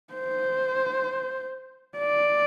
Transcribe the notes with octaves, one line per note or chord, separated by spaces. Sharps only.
C5
D5